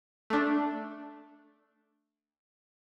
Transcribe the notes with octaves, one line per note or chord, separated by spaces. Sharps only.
A3 D4